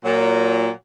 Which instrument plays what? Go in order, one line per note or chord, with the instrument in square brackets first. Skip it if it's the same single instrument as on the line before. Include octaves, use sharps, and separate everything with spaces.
[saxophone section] A#2 F#3